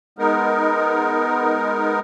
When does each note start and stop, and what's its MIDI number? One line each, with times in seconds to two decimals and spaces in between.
0.19 2.00 56
0.19 2.00 59
0.19 2.00 63
0.19 2.00 70